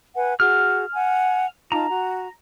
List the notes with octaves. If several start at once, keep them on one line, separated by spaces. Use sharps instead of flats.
B4 F#5 G#5
F#4 G#4 F6
F#5 G#5
D#4 F4 A5 A#5
F#4